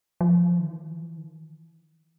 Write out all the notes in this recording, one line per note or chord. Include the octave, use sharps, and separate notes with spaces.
F3
D#3
E3
D#3